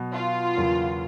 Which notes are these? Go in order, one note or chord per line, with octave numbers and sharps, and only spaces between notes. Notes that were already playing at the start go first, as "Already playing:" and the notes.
Already playing: B2 F#3 B3
F4
E2 C#3 F#3 A#3 C#4